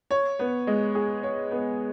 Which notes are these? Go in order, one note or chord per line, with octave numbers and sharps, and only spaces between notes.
C#5
B3
G#3
G#4
C#5
B3